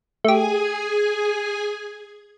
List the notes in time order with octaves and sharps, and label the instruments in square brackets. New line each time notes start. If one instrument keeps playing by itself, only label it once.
[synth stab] A3 G4 [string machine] G#4 G#5